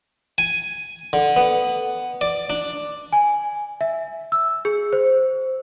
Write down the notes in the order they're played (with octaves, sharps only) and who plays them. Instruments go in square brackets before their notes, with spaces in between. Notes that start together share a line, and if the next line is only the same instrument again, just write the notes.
[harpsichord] G#5
D3
B3
D5
D4
[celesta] G#5
E5
E6
G#4
C5